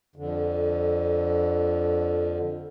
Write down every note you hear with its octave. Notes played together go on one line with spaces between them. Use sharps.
F2 D3